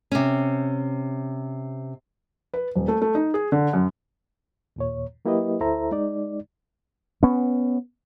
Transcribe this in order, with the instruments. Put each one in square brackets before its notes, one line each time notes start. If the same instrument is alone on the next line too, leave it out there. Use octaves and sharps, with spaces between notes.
[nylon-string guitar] C3 C#4
[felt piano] B4
D#1
A3
A3
D#4
G#4
D3
F#2
[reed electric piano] D#2 A#2 C#5
F#3 A#3 E4 G4 B4 D#5
D2 E4 A4 C5 E5 A#5
G#3 D#4 D5
[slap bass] B3 C#4